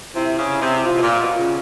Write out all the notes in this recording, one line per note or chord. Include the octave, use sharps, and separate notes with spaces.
C3 E4
C#3
C3
C3 F4
B2
A#2
B2
C#3